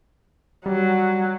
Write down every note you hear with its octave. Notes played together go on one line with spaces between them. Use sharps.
F#3 G3